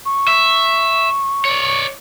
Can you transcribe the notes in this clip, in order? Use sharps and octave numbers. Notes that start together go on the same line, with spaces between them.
C#6
E5
C#5 D5